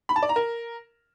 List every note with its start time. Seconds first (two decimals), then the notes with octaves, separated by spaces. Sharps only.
0.09 B5
0.16 A5
0.23 D5
0.29 A#5
0.36 A#4